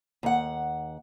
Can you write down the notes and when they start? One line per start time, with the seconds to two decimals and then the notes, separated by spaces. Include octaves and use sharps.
0.23 D#2 F#5